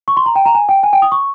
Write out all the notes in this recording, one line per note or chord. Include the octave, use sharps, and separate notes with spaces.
C#6
C6
A#5
G5
A#5
G#5
G5
G#5
G5
D#6
C#6